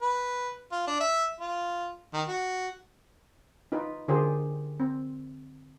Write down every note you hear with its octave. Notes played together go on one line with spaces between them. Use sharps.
B4
F4
D4
E5
F4
D#3
F#4
D#4 F4 B4
D3 F4 G4 G#4 A#4 C5
C4